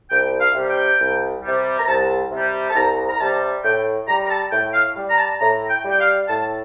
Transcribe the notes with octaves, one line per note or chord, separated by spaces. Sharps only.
C2 G5
F5
C3 G3
G5
C2
C3 G3
A#5
C2 A5
C3 G3
A5
C2 A#5
A#5
C3 G3 A5
A2 G5
G3 A#5
A#5
A5
A2 G5
F5
G3
A#5
A5
A2 A#5
G5
G3
G5
F5
A2 A5